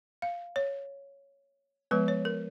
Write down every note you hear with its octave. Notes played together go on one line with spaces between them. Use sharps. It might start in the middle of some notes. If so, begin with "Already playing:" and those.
F5
C#5
F3 G#3 B3 B4
C#5
A#4